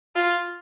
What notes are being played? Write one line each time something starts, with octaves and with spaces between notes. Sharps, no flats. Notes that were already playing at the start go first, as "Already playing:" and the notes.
F4